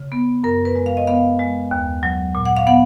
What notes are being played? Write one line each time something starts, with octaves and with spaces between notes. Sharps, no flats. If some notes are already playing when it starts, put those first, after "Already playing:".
Already playing: C#3
B3
F#2 A#4
B4
G#3
F5
D#5
B3 F5
G#3
D#2
F#3
A#2
F#5
F5
B3 F#5